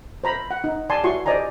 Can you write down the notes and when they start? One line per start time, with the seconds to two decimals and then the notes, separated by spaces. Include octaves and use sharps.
0.24 C5 A#5 B5
0.51 F#5
0.64 D#4
0.90 D5 G#5 A5 C6
1.03 E4 F#4 C6 C#6
1.26 C5 D5 D#5 G#5 A#5